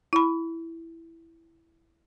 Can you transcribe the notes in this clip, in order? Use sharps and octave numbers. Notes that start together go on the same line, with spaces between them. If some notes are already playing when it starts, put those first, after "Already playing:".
E4 B5